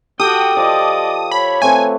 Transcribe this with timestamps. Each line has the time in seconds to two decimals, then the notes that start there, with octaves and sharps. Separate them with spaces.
0.20 F#4 G4 A4 G5 D#6
0.57 F3 D5 D#5
1.31 C#5 B5
1.62 A3 C4 B4 G#5